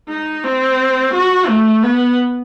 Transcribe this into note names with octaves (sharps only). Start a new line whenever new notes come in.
D#4
C4
F#4
A3
B3